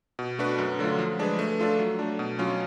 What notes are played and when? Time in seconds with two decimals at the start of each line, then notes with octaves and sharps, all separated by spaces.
0.19 B2
0.39 A3 D4 F#4 B4
0.58 F#2
0.79 D3 F#3 A3 F4
0.98 F3
1.19 G#3 D4 G#4 B4
1.39 A3
1.59 D4 F4 A4
1.79 F#3
1.99 A3 D4
2.19 B2
2.39 F#3 C#4 F4